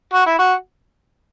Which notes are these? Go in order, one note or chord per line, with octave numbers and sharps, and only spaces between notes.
F#4
E4
F#4